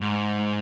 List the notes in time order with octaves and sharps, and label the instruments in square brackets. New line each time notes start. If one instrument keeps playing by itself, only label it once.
[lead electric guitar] G#2